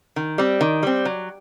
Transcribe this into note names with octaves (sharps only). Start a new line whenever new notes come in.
D#3
G3 C4
D#3
G3 C4
F#3